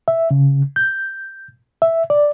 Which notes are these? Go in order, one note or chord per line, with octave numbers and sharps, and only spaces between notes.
E5
C#3
G6
E5
D5